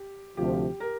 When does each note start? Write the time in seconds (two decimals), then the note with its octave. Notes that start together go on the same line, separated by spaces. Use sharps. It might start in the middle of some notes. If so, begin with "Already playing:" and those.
Already playing: G4
0.37 D2 C3 F3 G4
0.80 A#4